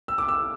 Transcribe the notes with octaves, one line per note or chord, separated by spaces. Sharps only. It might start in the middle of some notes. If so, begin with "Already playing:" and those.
E6
D6
E6